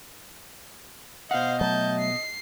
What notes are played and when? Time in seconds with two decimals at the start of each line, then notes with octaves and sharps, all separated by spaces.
1.31 B2 C5 D#5 F5 F#5
1.61 F#3 A3 A5 G6
2.00 C7